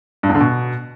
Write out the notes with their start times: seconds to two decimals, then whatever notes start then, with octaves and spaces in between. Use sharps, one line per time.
0.23 G2
0.29 E2
0.35 D3
0.40 B2